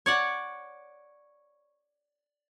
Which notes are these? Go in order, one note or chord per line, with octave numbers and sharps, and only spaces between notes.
C#5 D5 F#5